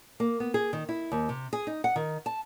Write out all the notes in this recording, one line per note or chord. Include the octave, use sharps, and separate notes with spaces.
A#3
B3
G#4
D#3
E4
D#2
C3
G#4
D#4
F#5
D#3
A5